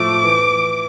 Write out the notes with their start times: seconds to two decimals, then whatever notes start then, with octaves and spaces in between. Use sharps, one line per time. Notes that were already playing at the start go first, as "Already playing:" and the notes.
Already playing: A2 F3 A3 D6
0.24 E3